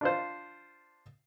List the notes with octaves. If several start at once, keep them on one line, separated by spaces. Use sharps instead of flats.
D4 F4 C5